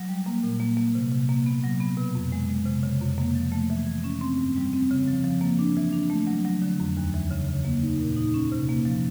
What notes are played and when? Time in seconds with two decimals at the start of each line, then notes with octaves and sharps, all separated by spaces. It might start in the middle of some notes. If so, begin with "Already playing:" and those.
Already playing: F#3
0.09 G3
0.26 A#3
0.43 A#2
0.60 A#3
0.77 A#3
0.95 C3
1.12 C3
1.29 A#3
1.46 B3
1.64 F#3
1.80 B3
1.97 B2
2.15 F2
2.32 G#3
2.50 G#3
2.66 C3
2.83 C#3
3.01 F2
3.18 A#3
3.35 F3
3.52 A3
3.70 E3
3.87 E3
4.04 C#4
4.21 C4
4.38 G2
4.56 G3
4.73 C4
4.90 C#3
5.08 F3
5.24 F3
5.41 A#3
5.59 D4
5.77 E3
5.93 D4
6.10 A3
6.27 F#3
6.45 F#3
6.62 D3
6.80 F2
6.97 D#2
7.14 E3
7.31 C#3
7.49 C#3
7.65 A#3
7.82 D#4
8.00 A#2
8.16 D#4
8.34 C#4
8.52 C3
8.69 A#3
8.85 F3